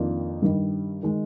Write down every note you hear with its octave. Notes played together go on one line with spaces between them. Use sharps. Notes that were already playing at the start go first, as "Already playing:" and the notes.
Already playing: F2 D#3 A#3 D4 F4
G2 D#3 G3
D#3 G#3